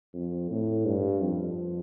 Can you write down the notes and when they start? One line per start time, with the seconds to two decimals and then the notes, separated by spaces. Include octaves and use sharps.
0.14 F2
0.50 A2
0.86 G2
1.22 F2